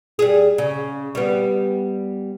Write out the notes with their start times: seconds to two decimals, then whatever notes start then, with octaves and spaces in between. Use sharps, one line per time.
0.19 G3 G#4
0.58 C#3
1.15 G3 B3